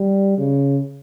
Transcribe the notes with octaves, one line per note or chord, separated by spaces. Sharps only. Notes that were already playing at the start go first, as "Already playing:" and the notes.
Already playing: G3
C#3